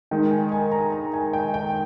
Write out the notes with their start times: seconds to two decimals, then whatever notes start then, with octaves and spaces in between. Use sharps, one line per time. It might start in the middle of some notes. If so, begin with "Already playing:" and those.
0.11 D#3 G#3 D#4 G5
0.31 G#5
0.52 G#5
0.72 A#5
0.92 A#5
1.13 G#5
1.33 G5
1.54 G5